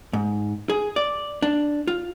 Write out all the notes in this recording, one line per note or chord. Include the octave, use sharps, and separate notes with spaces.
G#2
G#4
D5
D4
F4